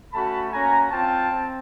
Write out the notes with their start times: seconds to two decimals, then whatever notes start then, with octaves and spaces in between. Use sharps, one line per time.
0.13 A3 C#4 F#4 A5 B5
0.52 A#3 C#4 F#4 G#5 A#5
0.91 C4 F4 G5 A5
1.31 C4